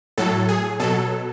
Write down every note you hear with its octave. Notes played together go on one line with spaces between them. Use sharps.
A2 F#3 A4
G#4
B2 F#3 A4